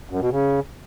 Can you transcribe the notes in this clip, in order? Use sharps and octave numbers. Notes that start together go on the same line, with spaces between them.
F#2
B2
C#3